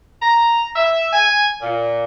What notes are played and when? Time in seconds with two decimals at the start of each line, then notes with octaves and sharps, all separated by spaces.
0.22 A#5
0.76 E5
1.13 G#5
1.62 A#2